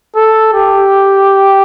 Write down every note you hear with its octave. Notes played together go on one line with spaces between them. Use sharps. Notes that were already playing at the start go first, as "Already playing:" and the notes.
A4
G4